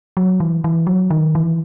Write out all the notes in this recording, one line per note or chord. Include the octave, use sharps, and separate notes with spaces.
F#3
E3
E3
F#3
D#3
E3